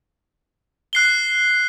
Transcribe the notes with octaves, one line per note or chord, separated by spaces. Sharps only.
F#6 C7 G7